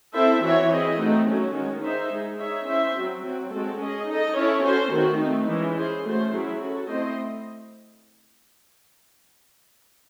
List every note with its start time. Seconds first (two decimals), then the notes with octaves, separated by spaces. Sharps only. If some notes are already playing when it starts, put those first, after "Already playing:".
0.14 C4 E4 A4 C5 E5
0.42 E3 C4 F#4 C#5 E5
0.70 C4 E4 G#4 D#5
0.98 A3 C4 D#4 F#4
1.27 F#3 A3 C#4 F#4
1.55 D#3 G#3 C#4 F#4
1.83 D#4 G#4 C5 E5
2.11 G#3 D#4 G#4
2.39 D#4 G#4 C#5 E5
2.67 C#4 E4 C5 E5
2.95 F#3 C4 F#4
3.24 F#3 C4 F#4
3.52 G#3 C4 F#4 A4
3.80 C#4 G#4 D#5
4.08 D#4 A4 D#5
4.36 C#4 E4 A4 C#5
4.64 C#4 F#4 A4 C5
4.93 D#3 A3 C4 F#4
5.21 A3 C4 D#4
5.48 E3 G#3 C#4
5.77 C#4 G#4 C5
6.05 A3 C#4 F#4 C5
6.33 F#3 C#4 E4 G#4
6.61 C#4 F#4 A4
6.89 A3 C4 E4 C5 D#5